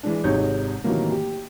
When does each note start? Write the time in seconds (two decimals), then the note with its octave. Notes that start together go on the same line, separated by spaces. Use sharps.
0.03 E3 G#3 D4
0.24 G#1 C3 D#4 G#4 C#5 G6
0.84 A2 C3 D#3 E3 F#3 A#3
1.12 G4